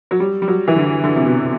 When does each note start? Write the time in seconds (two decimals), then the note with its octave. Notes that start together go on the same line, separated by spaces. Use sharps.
0.11 F#3
0.20 G3
0.42 G3
0.48 F#3
0.68 E3
0.76 D3
1.04 D3
1.16 C3
1.26 B2